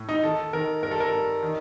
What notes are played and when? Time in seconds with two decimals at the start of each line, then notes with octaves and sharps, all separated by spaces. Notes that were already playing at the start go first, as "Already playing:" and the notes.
Already playing: A2
0.09 D#4
0.23 D#3 A4
0.53 D#3 A#4
0.82 G2 A#4
0.91 A4
1.00 A#4
1.13 G2
1.43 D#3